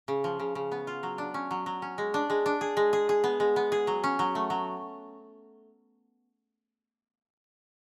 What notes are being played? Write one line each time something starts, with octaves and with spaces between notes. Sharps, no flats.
C#3
F3
C#3
C#3
B3
F4
F#3
D4
C#4
F#3
F#3
C#4
G#3
D4
G#3
D4
G#4
G#3
G#4
G#4
B3
G#3
B3
G#4
F#3
C#4
F#3
A3
F#3